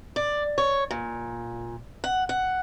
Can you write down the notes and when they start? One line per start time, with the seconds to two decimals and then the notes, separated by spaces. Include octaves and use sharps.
0.16 D5
0.58 C#5
0.91 A#2
2.04 F#5
2.29 F#5